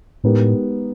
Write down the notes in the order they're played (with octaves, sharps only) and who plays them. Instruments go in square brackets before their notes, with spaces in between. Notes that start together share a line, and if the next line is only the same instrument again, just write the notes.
[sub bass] A2 [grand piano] G#3 B3 D#4 G4 A#4